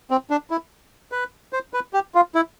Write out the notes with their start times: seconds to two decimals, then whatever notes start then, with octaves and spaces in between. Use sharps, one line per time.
0.10 C4
0.30 D4
0.51 E4
1.12 B4
1.53 C5
1.74 B4
1.93 G4
2.15 F4
2.35 E4